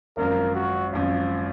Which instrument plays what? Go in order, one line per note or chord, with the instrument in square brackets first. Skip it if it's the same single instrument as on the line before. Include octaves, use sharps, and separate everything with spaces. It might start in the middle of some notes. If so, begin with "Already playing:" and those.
[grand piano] G#1 F#2 F3 [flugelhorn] A#4
[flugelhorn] F#4
[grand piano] G#1 F#2 F3